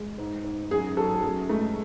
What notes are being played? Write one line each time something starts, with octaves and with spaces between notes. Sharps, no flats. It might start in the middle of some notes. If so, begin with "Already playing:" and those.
Already playing: G#3
G#2
G#2
F#2 G#4
F#3 A4
F#2 G#4
G#3 A3